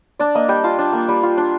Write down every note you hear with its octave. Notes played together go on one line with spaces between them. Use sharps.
D4 D5
A#3 D#5
G3 G5
F4 A5
D4
A#3
G3
F4
D4